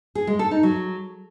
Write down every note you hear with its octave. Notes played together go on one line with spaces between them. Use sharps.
G#4
G#3
A4
D#4
F#3